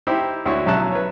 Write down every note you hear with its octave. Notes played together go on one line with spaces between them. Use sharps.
D#4 E4 G4 C5
D2 E4 F#4 C#5 C#6
B1 F#3 C#4 E5 A5 F#6
B4 C#5